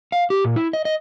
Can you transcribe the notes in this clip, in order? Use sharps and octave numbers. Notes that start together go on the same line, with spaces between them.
F5
G4
A#2
E4
D#5
D#5